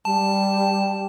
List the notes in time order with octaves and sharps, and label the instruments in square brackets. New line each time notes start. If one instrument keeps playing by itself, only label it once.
[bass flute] G3 [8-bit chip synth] A5